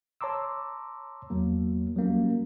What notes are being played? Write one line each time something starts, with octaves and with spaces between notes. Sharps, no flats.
C#5 A5 A#5 C6 D6 E6
E2 F#3 A#3
F#3 G3 A#3 C#4